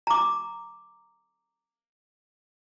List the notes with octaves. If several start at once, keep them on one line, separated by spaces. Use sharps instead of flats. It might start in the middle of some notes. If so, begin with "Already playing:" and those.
A#5 D6